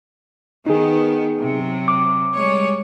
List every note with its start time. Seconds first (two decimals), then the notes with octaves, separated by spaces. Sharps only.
0.66 D#3 B3 D#4 G#4
1.41 C3 F#3
1.88 D6
2.34 G3 G#3 C#5